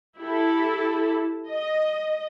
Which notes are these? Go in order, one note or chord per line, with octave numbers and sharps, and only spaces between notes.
E4 G4 A4
D#5